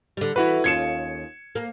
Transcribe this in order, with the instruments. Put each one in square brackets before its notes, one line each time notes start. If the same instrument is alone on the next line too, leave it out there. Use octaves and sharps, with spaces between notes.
[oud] D3 G3
[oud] E3 [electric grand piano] E4 F#4 B4
[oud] D#2 C#4 F4 [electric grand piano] G#6 C#7 E7
[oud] A#3